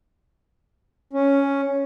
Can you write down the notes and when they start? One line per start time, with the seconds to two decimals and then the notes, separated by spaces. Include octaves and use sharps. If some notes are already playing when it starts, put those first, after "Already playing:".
1.13 C#4